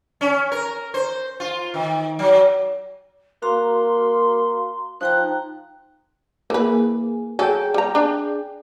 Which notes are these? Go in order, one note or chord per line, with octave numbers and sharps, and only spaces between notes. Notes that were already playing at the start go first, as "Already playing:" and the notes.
C#4
A#4
C5
F4
D#3
F#3
A#3 F#4 F5 A#5 C6
F3 D#4 G5 A#5 F#6
E3 A#3 G#4 B4
F#3 G#4 A4 G5
G3 A#5
D4